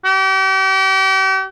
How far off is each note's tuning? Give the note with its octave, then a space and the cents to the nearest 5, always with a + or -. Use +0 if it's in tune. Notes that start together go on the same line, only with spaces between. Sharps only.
G4 -40